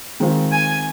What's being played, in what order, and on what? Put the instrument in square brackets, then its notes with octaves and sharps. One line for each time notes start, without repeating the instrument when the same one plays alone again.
[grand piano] D#3 G#3 C4 F4
[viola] G#5